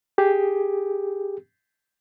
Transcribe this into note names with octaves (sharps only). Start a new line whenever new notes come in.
G4 G#4